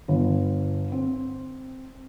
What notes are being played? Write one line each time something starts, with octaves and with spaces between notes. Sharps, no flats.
G1
C4